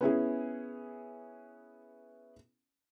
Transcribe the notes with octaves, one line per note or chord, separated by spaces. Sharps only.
B3 C#4 E4 G#4